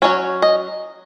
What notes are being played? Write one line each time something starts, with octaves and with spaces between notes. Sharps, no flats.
F#3 A3 C#4 C#5
D#5